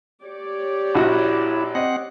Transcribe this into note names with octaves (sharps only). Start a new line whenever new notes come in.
G4 C#5 D5
A#1 E4 F#4
C4 D#5 F#5